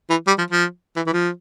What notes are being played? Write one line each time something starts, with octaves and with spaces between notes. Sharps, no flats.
E3
G3
F3
F3
E3
E3
F3